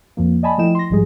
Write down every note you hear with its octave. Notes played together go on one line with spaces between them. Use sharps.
F2 F3 A#3
D5 D#5 G#5 A5 B5
F3 A3 E4 D#5 G5 E7
C6 A#6
A1 G#2 F3 G3 G#3 G#4